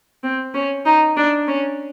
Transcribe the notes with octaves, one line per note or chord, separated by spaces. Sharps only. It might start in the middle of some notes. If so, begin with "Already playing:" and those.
C4
C#4
D#4
D4
C#4